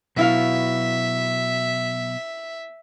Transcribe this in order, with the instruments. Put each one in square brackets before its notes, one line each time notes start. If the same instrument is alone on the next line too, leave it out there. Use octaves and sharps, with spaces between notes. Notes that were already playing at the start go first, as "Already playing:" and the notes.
[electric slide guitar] B2 F#3 [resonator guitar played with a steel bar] B3 E4 F5 [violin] E5